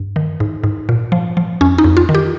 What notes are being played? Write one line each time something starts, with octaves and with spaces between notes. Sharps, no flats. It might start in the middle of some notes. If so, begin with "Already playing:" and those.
Already playing: G2
D#3
G#2
G#2
A#2
F3
F3
F2 C#4
D#4
F2
F4
D#3
G4